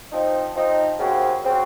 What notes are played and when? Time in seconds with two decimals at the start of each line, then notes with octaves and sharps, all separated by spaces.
0.12 F3 C4 D#4
0.55 F3 C4 D#4
0.99 D#2 C#3 F3 C4 F#4
1.44 C#3 F3 C4 F#4